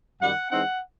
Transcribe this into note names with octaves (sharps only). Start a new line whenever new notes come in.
F#2 D#3 G3 F#5
E3 G#3 C4 D#4 F#5